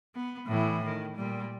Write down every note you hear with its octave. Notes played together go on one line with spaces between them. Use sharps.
B3
A2 E3
D#3
A#2 G3